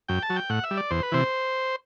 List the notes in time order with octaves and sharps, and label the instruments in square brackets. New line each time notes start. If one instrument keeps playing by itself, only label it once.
[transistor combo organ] F#2 G5
A5
F#3
G5
A2 F#5
E5
G3
D5
E2 C5
B4
C3 E3 C5